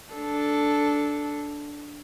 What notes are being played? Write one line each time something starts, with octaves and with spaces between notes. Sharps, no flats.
D4 A4